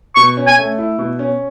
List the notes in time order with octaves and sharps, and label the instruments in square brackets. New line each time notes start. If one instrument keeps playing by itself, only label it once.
[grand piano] B2 [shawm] C#6
[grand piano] C#4
[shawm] G#5
[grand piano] A3
E4
B2
C#4